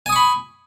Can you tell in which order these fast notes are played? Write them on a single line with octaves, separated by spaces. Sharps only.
G#5 D#6 C#6 B5